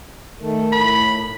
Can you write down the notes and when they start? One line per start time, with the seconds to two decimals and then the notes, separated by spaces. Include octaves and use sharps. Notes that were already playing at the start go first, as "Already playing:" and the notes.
0.41 D#3 A3
0.72 A2 B5